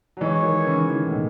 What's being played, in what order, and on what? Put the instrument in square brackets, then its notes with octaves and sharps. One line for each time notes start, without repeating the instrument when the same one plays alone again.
[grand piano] F#3
[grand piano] E3 G#3 [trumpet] C#5
[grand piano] D#3 F#3
C#3 E3
C#3 E3
A2
B2